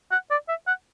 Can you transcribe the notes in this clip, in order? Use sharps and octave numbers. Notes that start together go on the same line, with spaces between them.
F#5
D5
E5
F#5